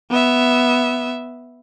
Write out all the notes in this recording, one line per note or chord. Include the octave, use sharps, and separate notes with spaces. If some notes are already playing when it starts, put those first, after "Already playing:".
B3 E5